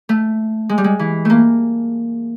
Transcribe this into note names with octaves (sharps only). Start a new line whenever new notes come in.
A3
G#3
G3
G#3
E3
A3 A#3